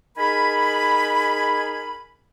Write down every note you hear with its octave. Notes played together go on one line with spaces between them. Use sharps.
D#4 G#4 A#4 G#5 B5